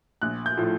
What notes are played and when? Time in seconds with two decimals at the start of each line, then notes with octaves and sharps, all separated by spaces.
0.22 A#1 F#6
0.46 G6
0.57 A2 F3